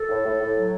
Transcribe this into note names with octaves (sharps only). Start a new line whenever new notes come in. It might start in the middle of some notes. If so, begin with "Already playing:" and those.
Already playing: A4
A2
A2
A2
F#3